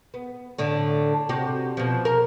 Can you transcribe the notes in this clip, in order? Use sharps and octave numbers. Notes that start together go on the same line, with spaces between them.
B3
A2 D3 A3
C3 F#4 G4
B2 F3
A#4